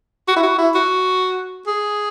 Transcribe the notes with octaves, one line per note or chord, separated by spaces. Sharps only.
F#4
E4
F#4
E4
F#4
G#4